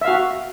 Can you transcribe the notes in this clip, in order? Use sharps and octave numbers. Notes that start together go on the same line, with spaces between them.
F#4 E5 F5